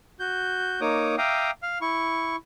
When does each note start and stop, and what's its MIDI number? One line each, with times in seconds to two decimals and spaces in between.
0.20 0.80 66
0.20 0.80 91
0.81 1.16 58
0.81 1.16 63
0.81 1.16 73
0.81 1.16 86
0.81 1.16 87
1.18 1.51 76
1.18 1.51 77
1.18 1.51 79
1.18 1.51 82
1.18 1.51 86
1.18 1.51 87
1.63 1.78 77
1.63 1.78 89
1.81 2.36 64
1.81 2.36 85